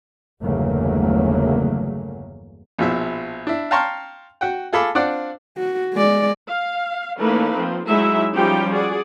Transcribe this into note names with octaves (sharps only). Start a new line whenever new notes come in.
G1 E2 C#3 F#3 A3 A#3
A#1 B2 F3 E4 E5
D4 E4
F5 G5 A5 A#5 C6 C#6
F#4 F#5 G5
F4 G#4 A4 A5 B5 D6
C4 D4 F4 D5 F#5
F#4
G#3 D5
F5
E3 A3 A#3 C#4 D#4 B4
F3 C4
F#3 G#3 D#4 E4 F#4 E5
F3 G3 C#4 D#4 G4 G5
F#4 G#4 D5